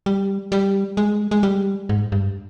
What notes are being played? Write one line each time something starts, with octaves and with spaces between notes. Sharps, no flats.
G3
G3
G#3
G#3
G3
G#2
G2